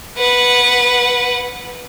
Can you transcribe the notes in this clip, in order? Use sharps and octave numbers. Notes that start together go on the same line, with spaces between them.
B4 F#5